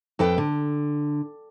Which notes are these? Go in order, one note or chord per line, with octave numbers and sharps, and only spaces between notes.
F2 A4 B4 G5
D3